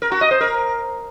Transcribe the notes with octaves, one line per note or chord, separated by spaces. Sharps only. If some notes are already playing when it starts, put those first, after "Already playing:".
A#4
F#4
D#5
C5
A#4